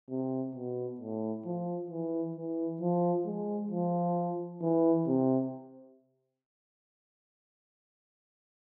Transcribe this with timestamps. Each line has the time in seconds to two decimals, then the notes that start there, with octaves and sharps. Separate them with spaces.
0.10 C3
0.55 B2
1.00 A2
1.46 F3
1.91 E3
2.36 E3
2.81 F3
3.26 G#3
3.71 F3
4.62 E3
5.07 C3